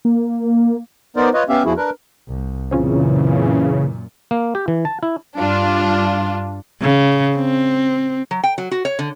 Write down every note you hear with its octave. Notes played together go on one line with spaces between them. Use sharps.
A#3
B3 D#4 A#4 C5 D5
F4 B4 C#5 D#5
B3 C#4 G4 E5 F5
E2 F3 E4 F#4 G#4
D4 A#4 B4
C2
F#2 A#2 C#3 E3 C4 C#4 F4
A#3
G4
E3
A5
E4
G2 D4 F4
C#3
C4
F#3
G5
F#3
F#4
C#5
D3